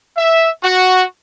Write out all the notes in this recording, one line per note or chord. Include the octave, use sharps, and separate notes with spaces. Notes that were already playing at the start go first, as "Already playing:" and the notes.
E5
F#4